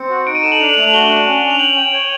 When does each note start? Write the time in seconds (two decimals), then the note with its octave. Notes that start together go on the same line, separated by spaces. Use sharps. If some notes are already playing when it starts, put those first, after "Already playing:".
Already playing: C4 C#7
0.09 F#4
0.26 D#4 D7
0.35 D#7
0.43 A4 E7
0.52 F#7
0.60 D4 F7
0.69 F#7
0.77 A3 F7
0.85 F#7
0.93 F#4 G7
1.09 D4
1.26 C#4
1.43 C#4
1.50 F7
1.59 G5 F#7
1.76 G5
1.93 C#5